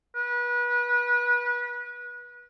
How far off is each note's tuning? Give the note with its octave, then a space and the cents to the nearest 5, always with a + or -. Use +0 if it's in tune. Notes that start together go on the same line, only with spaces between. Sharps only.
B4 -30